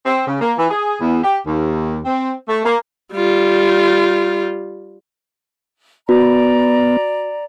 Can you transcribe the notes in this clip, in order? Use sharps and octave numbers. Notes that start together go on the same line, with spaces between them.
C4
C#3
A#3
E3
G#4
E2
G4
D#2
C4
A3
A#3
G3 F4
B3 F#4 D5 A#5